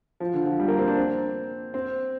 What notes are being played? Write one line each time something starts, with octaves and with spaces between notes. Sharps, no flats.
F3
D3
F3
G3
A#3
C4
D4
C4
C4